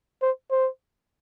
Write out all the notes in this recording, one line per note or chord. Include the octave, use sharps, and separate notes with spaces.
C5
C5